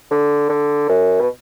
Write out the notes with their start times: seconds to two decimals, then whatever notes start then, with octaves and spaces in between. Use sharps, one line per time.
0.11 D3
0.50 D3
0.89 F#2
1.21 B2